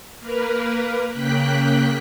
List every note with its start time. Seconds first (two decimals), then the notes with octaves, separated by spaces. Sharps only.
0.20 A#3 A#4 B4
1.11 C#3 A#3 G5 F#6 B6